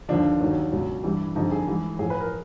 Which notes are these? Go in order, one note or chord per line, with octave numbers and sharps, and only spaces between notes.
D#2 D3 F3 D4
D#2 D#3 F#3
C#2 B2 F#3
G2 E3 G3
F2 D3 G3 D#4
G#4
G#2 E3 G3
A2 F3 G#4
B4
A#4